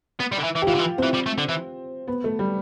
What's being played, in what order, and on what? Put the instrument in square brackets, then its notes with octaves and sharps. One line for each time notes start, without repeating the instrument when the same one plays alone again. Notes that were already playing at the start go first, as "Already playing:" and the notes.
[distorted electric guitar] B3
G3
D3
E3
E3
[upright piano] G4
[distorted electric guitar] E3 [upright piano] F4
[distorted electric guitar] D3
E3
[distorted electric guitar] E3 [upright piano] C4
[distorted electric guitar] G3
A3
D3
E3
[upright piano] B3
A3
G3